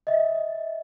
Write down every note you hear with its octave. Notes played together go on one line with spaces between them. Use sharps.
D#5 E5